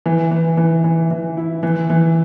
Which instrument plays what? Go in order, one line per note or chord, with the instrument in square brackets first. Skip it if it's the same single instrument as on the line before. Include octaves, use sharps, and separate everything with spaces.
[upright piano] E3
E3
E3
E3
E3
E4
E3
E3